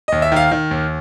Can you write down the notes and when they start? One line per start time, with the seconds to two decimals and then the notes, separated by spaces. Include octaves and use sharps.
0.08 D#2 D#5
0.22 E5
0.32 D#3 F5
0.51 D#3
0.71 D#2